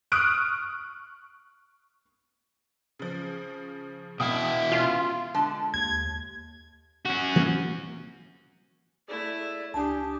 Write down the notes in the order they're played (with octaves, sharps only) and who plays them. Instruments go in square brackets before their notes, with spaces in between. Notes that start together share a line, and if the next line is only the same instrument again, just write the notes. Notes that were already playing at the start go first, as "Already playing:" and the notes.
[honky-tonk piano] C#6 D#6 F6 F#6 D7
C#3 F3
[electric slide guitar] B2 E4 [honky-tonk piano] F5 G5 D#6
[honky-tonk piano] C#4 C6 [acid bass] F4
[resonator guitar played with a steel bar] D3 G#3 A5
[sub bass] D#2 [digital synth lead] G#6
[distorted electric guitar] C#4 F#4
[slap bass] E3 A#3 C4
[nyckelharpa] A3 E4 [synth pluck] G#4 A4 [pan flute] D5
[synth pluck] C#2 G#5 D#6 [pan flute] D4 [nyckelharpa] G4 [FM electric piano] A5